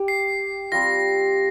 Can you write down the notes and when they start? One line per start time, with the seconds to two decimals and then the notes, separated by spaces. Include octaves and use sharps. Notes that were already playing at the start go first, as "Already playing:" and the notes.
Already playing: G4
0.08 C7
0.72 G3 C4 F4 A#6